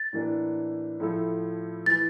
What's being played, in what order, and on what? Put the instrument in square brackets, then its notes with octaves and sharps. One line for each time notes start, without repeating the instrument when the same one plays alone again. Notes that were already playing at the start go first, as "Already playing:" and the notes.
Already playing: [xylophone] A6
[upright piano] A2 E3 A#3 D4
A2 F3 A3 E4 A4
[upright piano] E3 [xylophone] A6